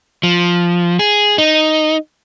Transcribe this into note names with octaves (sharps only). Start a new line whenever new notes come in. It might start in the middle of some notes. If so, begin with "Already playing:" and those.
F3
G#4
D#4